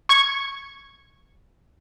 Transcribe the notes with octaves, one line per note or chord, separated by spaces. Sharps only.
C#6 G#6